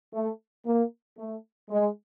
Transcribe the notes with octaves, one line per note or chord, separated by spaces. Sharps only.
A3
A#3
A3
G#3